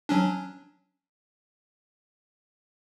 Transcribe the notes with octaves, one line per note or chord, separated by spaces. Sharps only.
F#3 C#4 D4